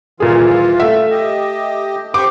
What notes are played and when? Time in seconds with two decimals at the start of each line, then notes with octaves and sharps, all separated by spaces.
0.20 D#1 A#2 E3 F4 G#4
0.80 A3 E5
1.11 G4 D#5
2.14 G4 C5 C#6 D6